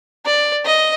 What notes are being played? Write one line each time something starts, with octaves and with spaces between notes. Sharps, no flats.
D5
D#5